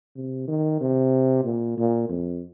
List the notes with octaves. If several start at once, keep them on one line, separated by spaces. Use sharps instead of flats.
C3
D#3
C3
A#2
A#2
F2